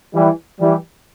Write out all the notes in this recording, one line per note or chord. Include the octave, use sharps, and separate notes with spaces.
E3 G3
E3 G3